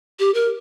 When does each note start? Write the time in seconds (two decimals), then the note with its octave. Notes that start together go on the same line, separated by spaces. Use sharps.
0.19 G4
0.34 A#4